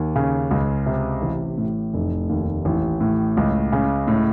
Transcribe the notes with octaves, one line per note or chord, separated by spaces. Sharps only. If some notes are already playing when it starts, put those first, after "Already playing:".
Already playing: D#2
C#3
C#2
C3
A1
A2
F1
D#2
A1
A2
C#2
C#3
A2